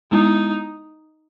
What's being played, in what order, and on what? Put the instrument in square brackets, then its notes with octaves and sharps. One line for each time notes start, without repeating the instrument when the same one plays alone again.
[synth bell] G#3 B3 E4 [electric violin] D#4